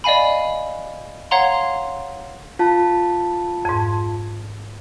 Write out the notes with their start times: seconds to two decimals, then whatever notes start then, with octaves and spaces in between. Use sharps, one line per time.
0.04 D5 D#5 F5 G#5 B5
1.31 C#5 F5 F#5 A#5 C6
2.59 F4 A5
3.65 F2 G#2